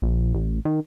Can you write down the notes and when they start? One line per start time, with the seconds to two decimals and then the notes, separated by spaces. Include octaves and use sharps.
0.02 A#1
0.34 A1
0.65 D#3